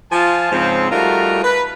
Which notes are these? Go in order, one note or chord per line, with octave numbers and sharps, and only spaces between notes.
F3 F4 F5 G#5 A5
G#2 C#3 F3 C4
G3 A3 D#4 F4 F#4 A#4
B4